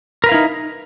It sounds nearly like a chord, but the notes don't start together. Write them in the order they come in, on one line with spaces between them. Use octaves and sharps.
A#4 B4 F5 E4 D#4